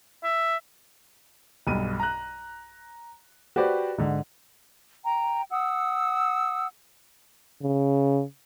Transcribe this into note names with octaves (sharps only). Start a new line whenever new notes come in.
E5
B1 G2 D#7
A#5 F#6
F#4 G4 B4 C5 D5
G#2 D3
G5 A#5
F#5 D#6 E6
C#3